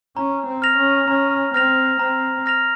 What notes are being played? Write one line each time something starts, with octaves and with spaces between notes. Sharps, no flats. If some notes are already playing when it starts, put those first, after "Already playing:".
C#4 A#5
C4
F6 A#6 F7
C#4
C#4 A#5
C4 F6 A#6 F7
C4 A#5
F6 A#6 F7